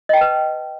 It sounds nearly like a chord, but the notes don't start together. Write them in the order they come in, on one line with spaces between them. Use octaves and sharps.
D#5 G5 A5 B4